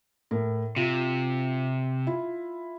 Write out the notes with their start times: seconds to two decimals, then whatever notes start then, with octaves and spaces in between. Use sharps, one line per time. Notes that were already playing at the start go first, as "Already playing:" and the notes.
0.31 A2 A#4
0.76 C3 F4
2.07 E4 F4